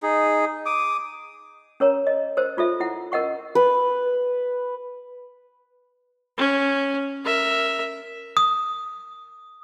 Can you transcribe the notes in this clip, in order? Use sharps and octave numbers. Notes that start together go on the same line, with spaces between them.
D#4 G#4
D6 D#6
C#4 A#4 C#5 A#5
D#5
A#4 C5
D#4 F4 A4 E5
E4 F#5
C#4 A#4 D#5 F#5 C#6
B4
C#4
A#4 E5
D#6